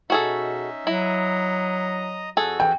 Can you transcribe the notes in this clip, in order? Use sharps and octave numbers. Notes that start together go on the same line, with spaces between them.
B2 C#4 D#4 F#4 G#4 A4 E5
F#3 E4 D#5 A#5 D#6
F2 F#4 G#4 A4
E3 G5